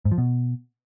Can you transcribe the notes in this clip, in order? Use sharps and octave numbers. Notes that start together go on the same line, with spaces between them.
G#2
F3
B2